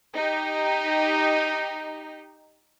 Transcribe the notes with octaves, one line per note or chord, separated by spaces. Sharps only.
D#4 G4